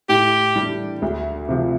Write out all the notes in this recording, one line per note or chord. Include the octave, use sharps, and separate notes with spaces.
A2 G4
G3 D4
D2
C3 F3